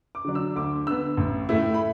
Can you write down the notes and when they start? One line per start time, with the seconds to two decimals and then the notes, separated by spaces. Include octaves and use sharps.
0.15 D6
0.25 D3 F#3 D4
0.35 E6
0.56 D2 D6
0.86 D3 B3 E6
1.17 A1
1.49 A2 A3 E4
1.74 B5